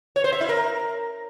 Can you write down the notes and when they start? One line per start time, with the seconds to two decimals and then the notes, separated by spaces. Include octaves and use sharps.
0.16 C#5
0.24 C5
0.33 E5
0.41 E4
0.49 A#4